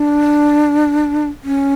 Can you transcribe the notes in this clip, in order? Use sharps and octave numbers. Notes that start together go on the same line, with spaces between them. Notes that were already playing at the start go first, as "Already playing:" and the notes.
Already playing: D4
C#4